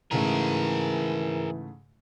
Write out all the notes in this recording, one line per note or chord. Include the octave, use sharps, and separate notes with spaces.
G#2 C#3 E3 A3 G#4 A#4